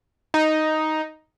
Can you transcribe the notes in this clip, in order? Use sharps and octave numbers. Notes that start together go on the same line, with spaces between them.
D#4